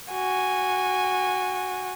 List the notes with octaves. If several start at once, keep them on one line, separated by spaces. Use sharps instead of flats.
F#4 G#5